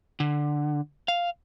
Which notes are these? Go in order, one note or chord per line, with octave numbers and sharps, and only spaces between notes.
D3
F5